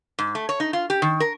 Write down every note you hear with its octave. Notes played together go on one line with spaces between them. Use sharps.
G#2
A3
C#5
D#4
F4
G4
D#3
A#4